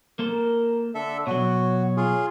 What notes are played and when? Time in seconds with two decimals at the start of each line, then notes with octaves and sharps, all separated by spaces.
0.19 A#3 A4 A#4 C5
0.95 D3 A4 E5
1.27 B2 F#3 F#4 C#5
1.97 F4 G#4